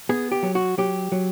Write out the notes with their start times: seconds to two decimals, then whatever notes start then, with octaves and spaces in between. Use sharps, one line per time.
0.09 B3 G#4
0.32 G4
0.43 F#3
0.55 F#4
0.78 F#3 G4
1.12 F#3